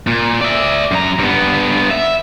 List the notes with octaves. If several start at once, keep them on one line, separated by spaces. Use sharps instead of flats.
A#2
D5 E5
F#2 A#5
G2 B3
E5